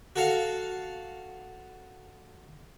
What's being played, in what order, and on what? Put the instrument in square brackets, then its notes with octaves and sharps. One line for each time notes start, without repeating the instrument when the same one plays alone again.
[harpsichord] F#4 A4 F5